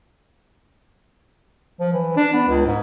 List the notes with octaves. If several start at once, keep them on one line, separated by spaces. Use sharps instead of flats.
F3
E3
D4
B3
C#2
G#2